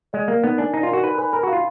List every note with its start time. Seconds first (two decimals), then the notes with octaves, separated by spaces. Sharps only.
0.13 G#3 D5
0.28 A#3 A#4
0.43 B3 D#4
0.58 D4 G#5
0.73 D#4 D5
0.83 F4
0.89 F#4 A#4
1.03 D#4 B4
1.18 B4 G#5
1.33 A#4 B5
1.43 F#4 F5
1.53 F4